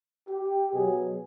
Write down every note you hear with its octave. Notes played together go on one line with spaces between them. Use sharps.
G4
B2 F#3 G#4